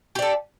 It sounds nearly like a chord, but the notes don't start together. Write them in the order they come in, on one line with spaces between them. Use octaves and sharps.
G4 D5 A4